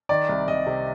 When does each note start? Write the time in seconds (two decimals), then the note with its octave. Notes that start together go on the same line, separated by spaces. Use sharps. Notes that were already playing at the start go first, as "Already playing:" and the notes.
0.09 D#3 D5
0.29 C2
0.48 C2 D#5
0.66 C3